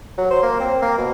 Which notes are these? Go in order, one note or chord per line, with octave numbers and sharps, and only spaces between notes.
F#3
C5
A#3
C4
A#3
B2